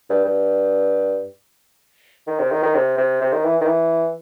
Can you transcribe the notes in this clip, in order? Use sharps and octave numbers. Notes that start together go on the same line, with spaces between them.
G2
G2
D#3
C3
D#3
D#3
C3
C3
C3
D#3
E3
D#3
E3